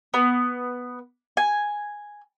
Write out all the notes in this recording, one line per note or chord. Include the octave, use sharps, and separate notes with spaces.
B3
G#5